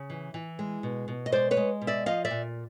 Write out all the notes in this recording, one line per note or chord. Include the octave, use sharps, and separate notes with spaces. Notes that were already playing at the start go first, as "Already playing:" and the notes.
Already playing: C#3
E3
E3
G#3
B2
B2
D#5
G#3 C5 D5
B4 C#5
G#3
B2
D5 E5
F3 D#5 F5
D5 E5
A#2